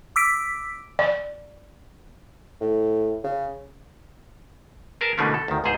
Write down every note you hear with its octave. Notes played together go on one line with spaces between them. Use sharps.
D6 E6 B6 D7
D5
A2
C#3
G#4 A#4 B4 A5
B2 D3 E3 A3 A#3 C#4
A4
D2 D#3
C#2 G#2 B2 G#4 C5